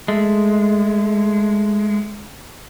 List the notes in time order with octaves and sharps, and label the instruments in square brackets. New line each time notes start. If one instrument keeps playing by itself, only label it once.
[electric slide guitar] G#3 A3